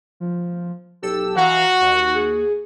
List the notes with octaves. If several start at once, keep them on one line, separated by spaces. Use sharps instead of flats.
F3
B1 G4 A4 E6
E3 F#4 F5 F#5 A#5
D#2
G#4